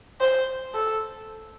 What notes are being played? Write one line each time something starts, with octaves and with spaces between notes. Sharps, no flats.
C5
A4